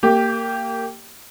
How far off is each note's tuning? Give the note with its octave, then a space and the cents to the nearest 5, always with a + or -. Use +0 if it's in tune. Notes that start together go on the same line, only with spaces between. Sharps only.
A#3 -20 G4 +0